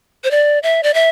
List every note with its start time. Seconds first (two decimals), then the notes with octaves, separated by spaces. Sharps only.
0.24 C5
0.31 D5
0.63 E5
0.83 D5
0.94 E5